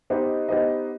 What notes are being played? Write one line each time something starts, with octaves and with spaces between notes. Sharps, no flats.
B3 D#4 G4 C5 D#5
B3 D#4 G4 C5 D#5